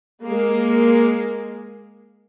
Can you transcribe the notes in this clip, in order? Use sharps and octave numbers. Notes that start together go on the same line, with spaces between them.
G#3 A#3